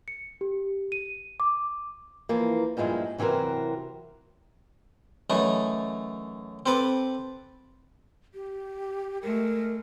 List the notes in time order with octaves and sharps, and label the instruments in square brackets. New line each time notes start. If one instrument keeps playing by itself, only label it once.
[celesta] C#7
G4
D#7
D6
[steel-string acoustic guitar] E3 F3 A#3
G2 A#2 F3 G#3 E4
C3 E3 F#3 C4 A#4
[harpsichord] F#2 E3 A3 D#4
C4 A4 B4 D6
[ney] G4
[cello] G#3 A3 [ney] A#4